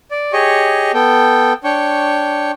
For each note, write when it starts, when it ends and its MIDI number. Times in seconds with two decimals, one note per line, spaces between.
0.11 0.33 74
0.33 0.92 67
0.33 0.92 68
0.33 0.92 73
0.33 0.92 75
0.33 0.92 85
0.94 1.53 59
0.94 1.53 69
0.94 1.53 79
1.64 2.51 62
1.64 2.51 73
1.64 2.51 79
1.64 2.51 85